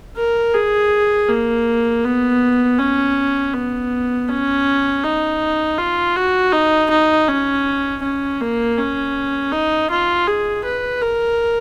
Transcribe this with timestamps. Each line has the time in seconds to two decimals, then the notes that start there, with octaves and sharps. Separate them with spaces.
0.17 A#4
0.55 G#4
1.29 A#3
2.05 B3
2.79 C#4
3.54 B3
4.29 C#4
5.04 D#4
5.78 F4
6.16 F#4
6.53 D#4
6.90 D#4
7.28 C#4
8.03 C#4
8.41 A#3
8.78 C#4
9.52 D#4
9.90 F4
10.27 G#4
10.65 B4
11.02 A#4